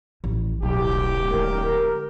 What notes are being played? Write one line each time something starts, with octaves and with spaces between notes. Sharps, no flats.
A1
D1 B1 G4
D3 G#3 A#4